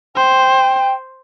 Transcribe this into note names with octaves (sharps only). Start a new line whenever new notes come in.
C5 G5